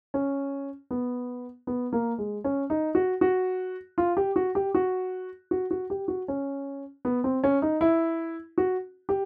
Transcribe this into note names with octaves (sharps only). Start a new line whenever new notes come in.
C#4
B3
B3
A#3
G#3
C#4
D#4
F#4
F#4
F4
G4
F#4
G4
F#4
F#4
F#4
G4
F#4
C#4
B3
C4
C#4
D#4
E4
F#4
G4